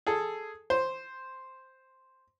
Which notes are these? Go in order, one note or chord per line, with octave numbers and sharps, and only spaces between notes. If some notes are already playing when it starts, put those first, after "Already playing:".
G#4 A4
C5